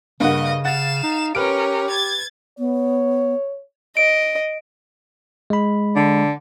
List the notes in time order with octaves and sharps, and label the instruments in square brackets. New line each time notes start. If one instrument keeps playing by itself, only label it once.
[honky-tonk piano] G2 A#3 F#5 [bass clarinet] C#3 [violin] D#5
[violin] F5 E7 [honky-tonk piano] F#5 A6
[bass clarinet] D#4
[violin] C#4 A#4 [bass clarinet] G4 [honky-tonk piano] B4 F6 D7
[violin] G#6 A6
[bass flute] B3 [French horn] C#5
[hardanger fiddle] D#5 [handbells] D7
[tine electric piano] G#3 B5
[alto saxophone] D3